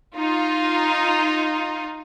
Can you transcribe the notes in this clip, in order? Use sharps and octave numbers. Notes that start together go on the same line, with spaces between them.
D#4 F4